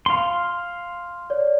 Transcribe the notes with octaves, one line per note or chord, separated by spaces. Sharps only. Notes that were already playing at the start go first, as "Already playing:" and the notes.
F5 C6
C#5 D5